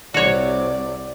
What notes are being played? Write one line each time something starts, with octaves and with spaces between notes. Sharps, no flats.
C2 C3 F#4 C#5 D5